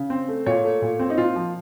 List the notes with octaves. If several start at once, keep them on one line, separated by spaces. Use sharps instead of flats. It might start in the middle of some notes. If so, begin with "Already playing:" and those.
Already playing: C#3
C4
A3
A#2 C#5
A3
A#2
C4
D#4
A#2 F4
F3